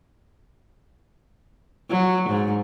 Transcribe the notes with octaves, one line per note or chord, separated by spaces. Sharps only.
F#3
G#2